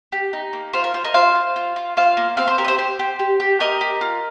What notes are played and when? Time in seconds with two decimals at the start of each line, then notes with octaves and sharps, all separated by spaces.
0.12 G4
0.33 D#4
0.53 A#3
0.73 F4 C5
0.84 A#4
0.94 F4 C5
1.04 A#4 D#5
1.14 F4 C5 F5
1.35 F4
1.56 F4
1.76 F4
1.97 F4 C5 F5
2.17 A#3
2.37 C4 C5 F5
2.48 C5
2.58 G4 A#4
2.64 D#5
2.68 C5
2.78 G4 C5
2.99 G4
3.19 G4
3.40 G4
3.60 G4 A#4 D#5
3.81 G4
4.01 F4